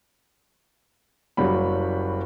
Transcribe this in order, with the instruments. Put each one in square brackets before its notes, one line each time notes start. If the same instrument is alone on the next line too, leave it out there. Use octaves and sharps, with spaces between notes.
[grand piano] F#1 F#3 G3 B5